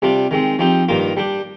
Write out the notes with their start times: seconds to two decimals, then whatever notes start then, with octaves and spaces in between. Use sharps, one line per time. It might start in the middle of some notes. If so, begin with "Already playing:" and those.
0.02 C3 G3 D4 F4
0.31 D#3 G#3 C4
0.59 F3 C4 D#4 G4
0.88 G2 D#3 A#3 F4
1.17 G3 D4 G4